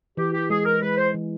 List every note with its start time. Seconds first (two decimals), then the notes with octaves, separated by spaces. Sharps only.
0.17 E3 G4
0.34 G4
0.50 G#3 G#4
0.66 A#4
0.82 G#3 B4
0.98 C5
1.14 E3